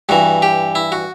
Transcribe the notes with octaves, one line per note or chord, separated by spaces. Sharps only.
G2 E3 F#4
G4
E4
F#4